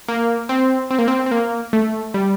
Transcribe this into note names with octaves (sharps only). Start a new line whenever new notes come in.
A#3
C4
C4
A#3
C4
C4
A#3
A3
G3